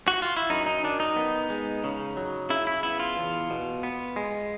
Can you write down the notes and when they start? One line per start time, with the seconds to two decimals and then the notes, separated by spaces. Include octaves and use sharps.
0.08 F#4
0.22 F4
0.37 E4
0.50 F#2 D#4
0.66 D#4
0.84 D#3 D4
1.00 D#4
1.16 B3
1.50 G#3
1.84 C#3
2.17 F#3
2.50 C#3 E4
2.67 E4
2.83 B3 E4
3.00 F4
3.17 E2
3.50 B2
3.83 B3
4.16 G#3